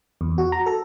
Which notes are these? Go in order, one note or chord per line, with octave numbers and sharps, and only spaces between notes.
E2
F#4
A#5
A4